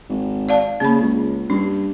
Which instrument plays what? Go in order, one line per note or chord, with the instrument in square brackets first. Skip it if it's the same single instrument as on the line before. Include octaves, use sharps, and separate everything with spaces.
[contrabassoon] G#1
[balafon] D5 F5 A5
[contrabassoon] C#3 [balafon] A#3 B5
[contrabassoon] C#2
[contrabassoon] G2 [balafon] C#4